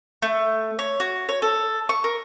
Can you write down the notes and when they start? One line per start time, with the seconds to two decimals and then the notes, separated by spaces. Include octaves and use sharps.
0.22 A3
0.79 C#5
1.00 F#4
1.29 C#5
1.42 A4
1.89 C#6
2.04 A#4